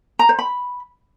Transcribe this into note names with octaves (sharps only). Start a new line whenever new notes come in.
A#5
C5
B5